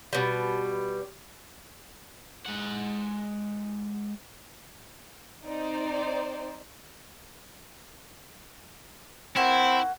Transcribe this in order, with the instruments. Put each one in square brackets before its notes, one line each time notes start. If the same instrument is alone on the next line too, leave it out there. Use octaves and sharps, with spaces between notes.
[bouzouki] B2 G3
[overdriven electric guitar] G#3 F#5
[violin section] C4 D#4 C5 D5
[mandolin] A#3 F#4 E6 [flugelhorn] C4 [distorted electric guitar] E4